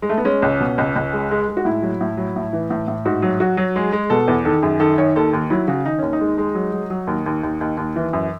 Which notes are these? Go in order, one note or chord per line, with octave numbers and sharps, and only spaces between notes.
G#3
A3
B3
G#3 C#4
C#2
B2
C#2
C#2
G#3
G#3
G#3
F#4
A2 E4
F#3
A2
F#3
A2
E3
A2
A2
G#2 F#4
F#3
F#3 F#4
F#3
G#3 G#4
G#3
B2 A4
E2
D#3 A4
F#2 G#4
D#3 A4
D#3 C#5
D#2 A4
D#2
F#3 E4
C#3 F#4
D#3 D#4
D#2 C#4
D#4
G#3
G#3
F#3
F#3
F#3
D#2
D#2
D#2
D#2
D#2
E3
F#2